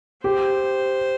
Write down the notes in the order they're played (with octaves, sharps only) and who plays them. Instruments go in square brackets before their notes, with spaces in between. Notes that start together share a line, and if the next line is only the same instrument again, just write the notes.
[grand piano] G4 [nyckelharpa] C5